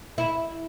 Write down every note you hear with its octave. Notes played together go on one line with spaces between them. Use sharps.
E4